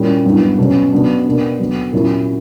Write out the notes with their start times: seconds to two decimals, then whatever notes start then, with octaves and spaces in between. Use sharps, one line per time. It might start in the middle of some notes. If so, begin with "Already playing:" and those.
Already playing: A#2 G3 C#4 E4
0.25 G2 F#3 B3 E4
0.59 B2 F#3 C#4
0.92 B2 F#3 B3 D4
1.26 B2 A#3 D4
1.59 D3 F#3 B3
1.93 A#2 F#3 A#3 C#4 E4